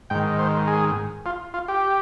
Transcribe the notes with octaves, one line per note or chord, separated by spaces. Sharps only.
G#2 D#3 G5
C5
G#4
F4
F4
G4